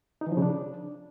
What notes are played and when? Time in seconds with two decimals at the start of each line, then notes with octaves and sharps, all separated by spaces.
0.21 D#4
0.27 E3
0.32 F3
0.37 C#3
0.42 D4